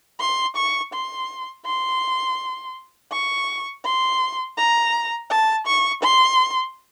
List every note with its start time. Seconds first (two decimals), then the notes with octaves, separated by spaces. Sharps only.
0.20 C6
0.56 C#6
0.93 C6
1.66 C6
3.12 C#6
3.85 C6
4.57 A#5
5.30 A5
5.67 C#6
6.03 C6